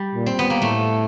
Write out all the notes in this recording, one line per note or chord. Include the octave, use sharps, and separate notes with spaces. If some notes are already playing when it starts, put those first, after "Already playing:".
Already playing: G3
A#2
C4
B3
A#3
A2 A3